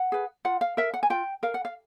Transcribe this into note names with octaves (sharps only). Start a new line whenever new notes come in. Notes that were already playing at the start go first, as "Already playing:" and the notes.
Already playing: F#5
G#4 B4
F4 F#5
F5
A#4 E5
F#5
G#5
F4 G5
A#4 F5
F#5
F5